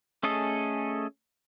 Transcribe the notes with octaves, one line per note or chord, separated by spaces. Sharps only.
A3 C#4 G#4 A4 D#5